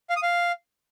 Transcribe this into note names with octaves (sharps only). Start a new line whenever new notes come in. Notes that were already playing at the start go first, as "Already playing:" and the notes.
F5
D#6
F5